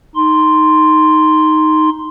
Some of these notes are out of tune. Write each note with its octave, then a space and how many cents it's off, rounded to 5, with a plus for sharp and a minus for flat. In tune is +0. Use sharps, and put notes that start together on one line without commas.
D#4 +0 C6 +0